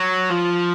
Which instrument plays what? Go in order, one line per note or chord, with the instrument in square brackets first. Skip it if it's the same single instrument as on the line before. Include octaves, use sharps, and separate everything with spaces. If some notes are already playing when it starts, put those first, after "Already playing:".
Already playing: [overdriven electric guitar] F#3
F3